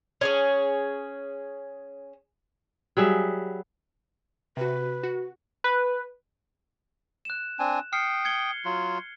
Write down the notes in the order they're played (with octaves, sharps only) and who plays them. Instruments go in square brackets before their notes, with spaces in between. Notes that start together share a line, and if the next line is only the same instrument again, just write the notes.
[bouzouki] C#4 G#4 C#5
[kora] F#3 G3 G#4 E5
[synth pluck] C3 F#4 [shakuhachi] B4
[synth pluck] F#4
[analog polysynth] B4
[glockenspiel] F#6 E7
[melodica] C4 D4 G#5
[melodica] G5 D#6 [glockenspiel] F6 C7 C#7
[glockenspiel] G#6 C#7 G7
[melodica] F#3 F4